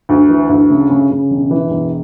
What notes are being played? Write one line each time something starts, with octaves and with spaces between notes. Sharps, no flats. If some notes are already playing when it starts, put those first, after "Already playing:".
D2
E3
D2
C#3
C#3
C#3
E1
E3
E1